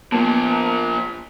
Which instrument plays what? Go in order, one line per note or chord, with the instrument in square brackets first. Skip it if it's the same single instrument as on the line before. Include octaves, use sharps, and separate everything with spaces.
[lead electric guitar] A#2 F3 [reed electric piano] A#3 A5 [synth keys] B3